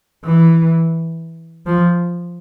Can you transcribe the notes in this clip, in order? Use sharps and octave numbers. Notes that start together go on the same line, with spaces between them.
E3
F3